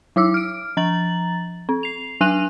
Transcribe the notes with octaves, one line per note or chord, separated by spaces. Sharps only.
F#3 E4 D6 E6
F6 D7
F3 A#5 A6 F#7
C4
C7 F7
F#3 D4 G#5 F#6 D#7 F7